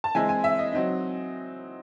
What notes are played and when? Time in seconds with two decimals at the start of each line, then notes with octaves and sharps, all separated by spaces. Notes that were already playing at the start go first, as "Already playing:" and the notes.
0.04 A5
0.15 E3 G#3 C4 E4 G#5
0.29 G#5
0.44 E5
0.59 D#5
0.73 F#3 C4 D#4